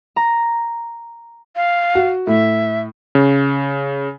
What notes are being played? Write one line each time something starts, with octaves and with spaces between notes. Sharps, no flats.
A#5
F5
F#4
A2 E5
C#3